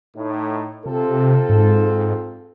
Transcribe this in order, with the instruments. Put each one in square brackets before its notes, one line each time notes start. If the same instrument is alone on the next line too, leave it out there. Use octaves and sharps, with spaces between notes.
[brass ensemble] A2 D#4
[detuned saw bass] C3 [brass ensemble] C4 F4 A4
[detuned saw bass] G#2